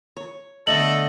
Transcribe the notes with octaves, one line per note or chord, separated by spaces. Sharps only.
C#5
D3 A3 B3 A4 D#5 F#7